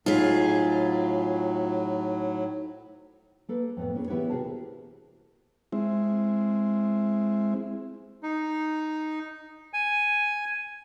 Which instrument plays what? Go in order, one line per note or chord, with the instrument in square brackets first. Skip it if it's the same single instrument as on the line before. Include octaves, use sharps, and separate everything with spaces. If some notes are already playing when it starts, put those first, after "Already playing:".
[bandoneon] A2 F#3 [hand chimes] D#4 C5 B6 [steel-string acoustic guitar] F4 G#4
[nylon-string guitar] A#3 A4 B4
F2 A2 B3
A#3 C#4 E4 G#4
E3 B3 E4 G4 B4 C#5
C3 F#4 G#4 A#4 A5
[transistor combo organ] G#3 C4 E4
[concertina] D#4
G#5